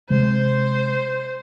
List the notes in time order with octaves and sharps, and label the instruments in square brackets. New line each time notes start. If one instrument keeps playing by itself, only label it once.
[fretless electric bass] C3 G#3 [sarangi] C5